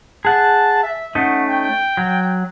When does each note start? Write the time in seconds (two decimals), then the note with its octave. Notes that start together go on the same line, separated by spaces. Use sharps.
0.25 G#4 F#5 A5
0.83 E5
1.15 A3 C#4 D#4 F#5
1.47 G5
1.97 F#3